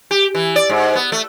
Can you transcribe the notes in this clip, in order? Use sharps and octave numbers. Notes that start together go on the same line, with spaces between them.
G4
E3
D5
G#2
B3
A3